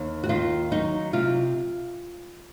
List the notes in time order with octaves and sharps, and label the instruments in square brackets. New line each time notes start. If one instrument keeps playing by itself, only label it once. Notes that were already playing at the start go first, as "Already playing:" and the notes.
Already playing: [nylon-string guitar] D#2 D#4
F#4
D#3 F4
F#3 D#4
C3 F4